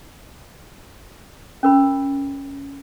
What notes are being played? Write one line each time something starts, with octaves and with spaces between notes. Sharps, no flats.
C#4 A#4 B5